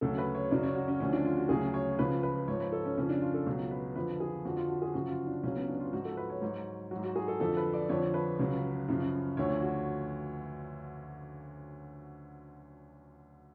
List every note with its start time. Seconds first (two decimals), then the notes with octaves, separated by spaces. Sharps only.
0.01 D2 C#3 F#3 A4
0.18 B4
0.35 C#5
0.51 F#2 C#3 F#3 D5
0.63 C#5
0.75 F#4
0.88 C#4
1.00 D2 D3 F3 C#4
1.13 D4
1.25 F4
1.37 F#4
1.49 D2 C#3 F#3 G#4
1.74 C#5
1.99 C#2 C#3 F3 B4
2.23 B4
2.48 G#2 F3 C#5
2.60 B4
2.72 A4
2.85 C#4
2.97 F2 C#3 F3 C#4
3.09 D4
3.22 F4
3.34 A4
3.46 C#2 B2 F#3
3.71 B4
3.96 F2 D3 F3 B4
4.20 G#4
4.45 F2 D3 F3 F#4
4.57 F4
4.70 F#4
4.82 G#4
4.94 F#2 C#3 F3 F#4
5.11 F4
5.27 D4
5.43 C#2 C#3 F#3 C#4
5.56 B3
5.68 D4
5.80 F4
5.93 G#2 F3 F#4
6.05 A4
6.17 B4
6.30 C#5
6.42 G#2 F#3
6.91 F#3 F#4
6.96 G#2
7.04 F#4
7.16 G#4
7.28 A4
7.40 F2 D3 F3 A4
7.57 B4
7.73 D5
7.89 F2 D3 F3 C#5
8.14 B4
8.39 C#2 C#3 F#3
8.88 F#2 C#3 F3
9.37 D2 D3 F3 C#5
9.62 F#4